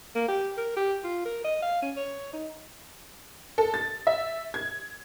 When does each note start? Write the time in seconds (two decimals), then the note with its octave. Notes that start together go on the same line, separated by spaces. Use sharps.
0.15 A#3
0.28 G4
0.57 A#4
0.77 G4
1.04 F4
1.25 A#4
1.44 D#5
1.62 F5
1.82 C#4
1.97 C#5
2.33 D#4
3.58 A4
3.74 A6
4.07 E5
4.54 G#6